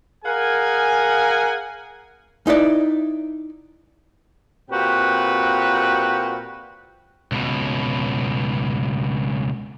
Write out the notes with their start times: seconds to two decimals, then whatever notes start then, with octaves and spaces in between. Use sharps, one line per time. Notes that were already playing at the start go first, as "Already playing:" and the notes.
0.25 G#4 A#4 F5 F#5 G#5
2.47 D#4 E4 B4 D5
4.70 A#2 C4 F#4 G4 B4 G5
7.32 C#2 B2